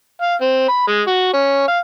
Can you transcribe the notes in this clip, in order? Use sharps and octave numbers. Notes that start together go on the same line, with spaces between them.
F5
C4
B5
G#3
F#4
C#4
F5